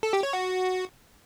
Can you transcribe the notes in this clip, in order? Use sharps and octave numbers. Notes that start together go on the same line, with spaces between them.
A4
G4
C#5
F#4